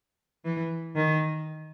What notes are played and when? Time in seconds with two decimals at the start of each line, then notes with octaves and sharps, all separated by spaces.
0.45 E3
0.96 D#3